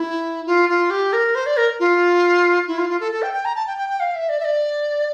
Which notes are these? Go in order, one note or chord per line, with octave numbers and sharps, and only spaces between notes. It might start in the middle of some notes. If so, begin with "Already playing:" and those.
Already playing: E4
F4
F4
G4
A#4
C5
D5
A#4
F4
E4
F4
F4
A4
A4
G5
G5
A#5
A5
G5
G5
G5
F5
E5
D5
E5
D5